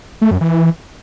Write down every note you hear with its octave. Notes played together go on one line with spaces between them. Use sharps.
A3
F#2
E3